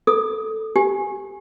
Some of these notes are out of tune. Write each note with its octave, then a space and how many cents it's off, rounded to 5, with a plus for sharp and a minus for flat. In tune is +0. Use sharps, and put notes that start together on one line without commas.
A4 +0 D#6 +15
G4 +0 G#5 +0